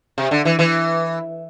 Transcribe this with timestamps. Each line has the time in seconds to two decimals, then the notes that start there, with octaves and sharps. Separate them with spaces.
0.18 C3
0.31 D3
0.45 E3
0.59 E3